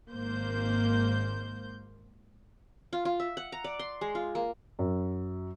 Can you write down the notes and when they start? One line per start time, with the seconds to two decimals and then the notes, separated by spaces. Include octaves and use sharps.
0.12 G#1 G#2 A#3 C5 G6
2.93 F4
3.05 F4
3.20 E5
3.37 F#5
3.52 A#5
3.64 D5
3.79 C6
4.01 G#3
4.15 F4
4.35 A#3
4.79 F#2